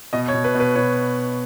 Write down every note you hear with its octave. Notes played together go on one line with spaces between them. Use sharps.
B2 D#5
C#5
B2
B4
B2
B4
B2 C#5